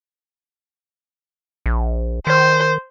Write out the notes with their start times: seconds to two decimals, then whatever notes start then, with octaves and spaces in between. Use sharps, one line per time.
1.66 A#1
2.27 D#3 C5